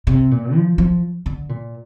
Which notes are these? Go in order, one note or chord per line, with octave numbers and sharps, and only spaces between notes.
C3
A#2
F3
F3
D3
A#2